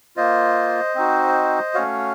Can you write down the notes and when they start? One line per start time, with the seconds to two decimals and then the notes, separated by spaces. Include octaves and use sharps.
0.16 A#3 F4 C5 D#5
0.95 C4 D#4 F#4
1.74 A3 C#4 F#4 C#5 F5